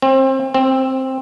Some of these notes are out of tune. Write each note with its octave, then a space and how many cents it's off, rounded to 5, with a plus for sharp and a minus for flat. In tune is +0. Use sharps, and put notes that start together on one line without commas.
C4 +30
C4 +10